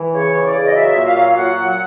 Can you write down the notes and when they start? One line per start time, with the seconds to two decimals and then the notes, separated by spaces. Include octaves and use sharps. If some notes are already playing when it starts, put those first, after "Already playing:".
Already playing: E3
0.13 C#3 C#5
0.34 E3
0.44 D5
0.55 C#3
0.66 D#5
0.75 F#3 E5
0.95 A#2
1.05 F5
1.15 F#3
1.26 F5
1.36 A#2 F#5
1.57 F#3